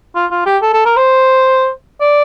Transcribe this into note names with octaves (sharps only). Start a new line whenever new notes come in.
F4
F4
G4
A4
A4
A#4
C5
D5